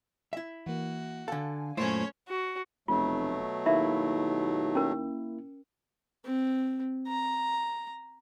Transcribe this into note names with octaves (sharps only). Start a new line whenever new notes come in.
E4 E5
E3 A#3 F#4
D3 A4 F5 G#5
F#2 A#2 A3 C#4 E4 C5 C#5
F#4
F1 B2 F#3 A3 F4
D#2 A#3 E4 E5
C#4 A#4
C4
A#5